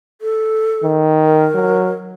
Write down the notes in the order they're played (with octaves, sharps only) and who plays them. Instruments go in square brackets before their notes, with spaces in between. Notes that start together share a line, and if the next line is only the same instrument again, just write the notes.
[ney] A4
[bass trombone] D#3
[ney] A#4
[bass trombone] F#3